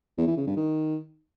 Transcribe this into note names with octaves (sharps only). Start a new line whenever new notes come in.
E2
E3
C#3
G2
D#3